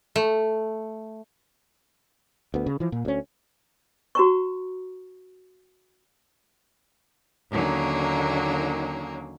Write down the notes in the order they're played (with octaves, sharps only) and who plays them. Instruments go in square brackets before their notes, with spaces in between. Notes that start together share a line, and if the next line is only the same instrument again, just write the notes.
[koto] A3
[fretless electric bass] D2 B3
C#3
E3 F3
A#2
D2 C#4
[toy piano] F#4 A#5 C#6
[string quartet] D#2 D3 D#3 F#3 A#3 C#4